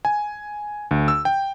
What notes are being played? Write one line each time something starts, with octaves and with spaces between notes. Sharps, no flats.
G#5
D2
E6
G5